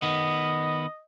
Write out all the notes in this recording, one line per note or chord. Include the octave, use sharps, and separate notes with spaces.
D#3 B3 D#5